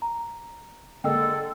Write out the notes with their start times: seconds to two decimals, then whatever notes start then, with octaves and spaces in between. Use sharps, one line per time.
0.02 A#5
1.04 D3 G#3 A#3 A4 G5 E6